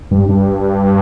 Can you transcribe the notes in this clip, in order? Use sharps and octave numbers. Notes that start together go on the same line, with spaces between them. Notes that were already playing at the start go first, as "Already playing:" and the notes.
G2
G2